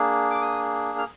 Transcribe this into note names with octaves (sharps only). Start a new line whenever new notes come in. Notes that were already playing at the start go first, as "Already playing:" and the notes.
Already playing: A#3 D4 G#4
D6
D#6
F6